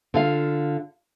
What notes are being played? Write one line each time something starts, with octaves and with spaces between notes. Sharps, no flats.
D3 F4 F5